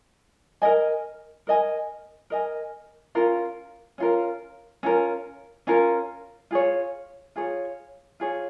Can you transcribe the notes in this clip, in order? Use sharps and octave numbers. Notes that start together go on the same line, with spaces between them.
A#4 D#5 G#5
A#4 D#5 G#5
A#4 D#5 G#5
C#4 F4 A#4
C#4 F4 A#4
C#4 F4 A#4
C#4 F4 A#4
F4 G#4 C#5
F4 G#4 C#5
F4 G#4 C#5